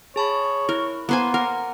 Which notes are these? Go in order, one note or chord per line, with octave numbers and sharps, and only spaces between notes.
G#4 C#5 A5 B5
E4 A#4
A#3 B3 C5 G#5
A#4 F#5